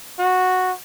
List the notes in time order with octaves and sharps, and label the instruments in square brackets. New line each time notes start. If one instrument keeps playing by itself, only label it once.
[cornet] F#4